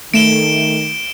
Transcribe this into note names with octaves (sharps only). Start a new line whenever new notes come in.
D#3 A3 D7 E7 G7